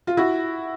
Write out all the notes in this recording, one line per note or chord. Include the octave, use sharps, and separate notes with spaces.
F4
E4 F#4